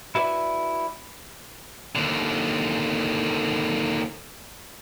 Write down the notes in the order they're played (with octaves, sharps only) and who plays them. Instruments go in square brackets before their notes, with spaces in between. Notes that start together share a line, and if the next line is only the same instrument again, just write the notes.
[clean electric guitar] E4 F#4 B4 C5 D5 E5
[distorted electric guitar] D#2 D3